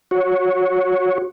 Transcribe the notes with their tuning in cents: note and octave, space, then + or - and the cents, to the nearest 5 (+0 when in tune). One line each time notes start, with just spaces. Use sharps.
F#4 -20 C#5 +0